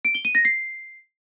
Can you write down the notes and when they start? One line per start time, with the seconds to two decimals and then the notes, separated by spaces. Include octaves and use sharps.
0.05 D7
0.15 G7
0.25 D#7
0.35 A#6
0.45 C7